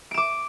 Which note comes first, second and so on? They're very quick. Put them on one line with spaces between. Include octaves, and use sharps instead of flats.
D7 E7 D6